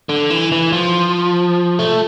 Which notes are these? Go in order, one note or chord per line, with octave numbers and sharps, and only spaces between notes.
D3
E3
E3
F3
A3